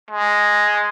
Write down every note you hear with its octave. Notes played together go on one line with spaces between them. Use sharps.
G#3